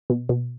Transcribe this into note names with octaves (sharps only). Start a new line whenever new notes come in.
B2
B2